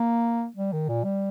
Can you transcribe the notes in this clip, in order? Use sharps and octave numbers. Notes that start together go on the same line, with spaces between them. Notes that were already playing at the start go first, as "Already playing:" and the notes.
Already playing: A#3
G3
D#3
A#2
G3